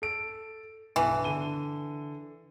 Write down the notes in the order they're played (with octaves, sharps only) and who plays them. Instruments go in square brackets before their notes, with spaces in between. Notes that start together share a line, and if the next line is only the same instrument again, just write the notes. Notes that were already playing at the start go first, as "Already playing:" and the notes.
[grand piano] A4 D7
[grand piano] B1 G2 [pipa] E3
[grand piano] D3 D#7 G7